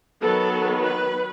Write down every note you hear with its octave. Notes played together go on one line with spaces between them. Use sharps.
D#3 F#3 B3 A4
B4